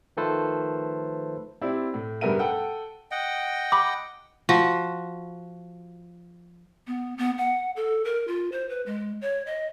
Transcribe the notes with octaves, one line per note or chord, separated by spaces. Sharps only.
D#3 F3 A3 A4 B4 C5
C4 E4 G4 D5
A2
G2 C#3 B3 A#4 E5 D#7
A4 F#5 G5
D#5 F#5 G5
B5 D6
F3 F#4
B3
B3
F#5
A4
A#4
F4
C5
B4
G#3
C#5
D#5